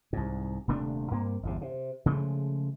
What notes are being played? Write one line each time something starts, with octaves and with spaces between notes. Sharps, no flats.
C2 G#2
D#1 C3 A3 D4
G2 A#3 C4
G1 E2 C3
C3
C#3 F3 G#3 A3